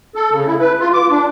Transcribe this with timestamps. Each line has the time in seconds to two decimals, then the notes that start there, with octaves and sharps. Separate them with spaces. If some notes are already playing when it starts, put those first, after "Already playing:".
0.15 A4
0.32 C#3
0.46 E4
0.60 B4
0.80 F4
0.93 D6
1.11 D4